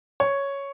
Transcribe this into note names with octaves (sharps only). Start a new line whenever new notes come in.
C#5